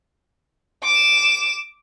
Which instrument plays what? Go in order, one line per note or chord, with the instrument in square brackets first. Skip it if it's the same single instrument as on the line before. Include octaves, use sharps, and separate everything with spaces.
[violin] D6 E7